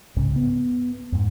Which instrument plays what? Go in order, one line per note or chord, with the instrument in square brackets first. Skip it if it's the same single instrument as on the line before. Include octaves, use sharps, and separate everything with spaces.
[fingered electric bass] C2 G#2 C#3
B3
F2 G#2